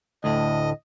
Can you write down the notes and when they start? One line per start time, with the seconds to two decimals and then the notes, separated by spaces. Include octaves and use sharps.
0.24 D2 A2 D#5